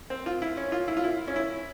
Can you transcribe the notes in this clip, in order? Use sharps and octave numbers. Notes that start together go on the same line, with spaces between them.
C4
F4
E4
C#4
F4
E4
F4
E4
C#4
E4